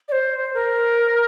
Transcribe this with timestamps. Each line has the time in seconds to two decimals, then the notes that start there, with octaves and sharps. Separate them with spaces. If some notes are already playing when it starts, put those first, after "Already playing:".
0.08 D5
0.12 C5
0.54 A#4